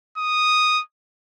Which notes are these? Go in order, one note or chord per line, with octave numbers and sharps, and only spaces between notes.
D#6